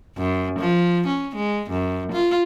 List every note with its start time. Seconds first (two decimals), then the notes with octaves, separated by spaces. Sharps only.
0.17 F#2
0.59 F3
1.07 C#4
1.36 G#3
1.71 F#2
2.12 F4